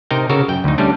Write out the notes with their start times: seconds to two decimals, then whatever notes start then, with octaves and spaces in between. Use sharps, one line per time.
0.11 C3 D#4 A#4 G5
0.29 C#3 F#4 A4 A#4 A5
0.48 F#2 G5
0.64 D2 D#4
0.78 G3 A3 C#4 D4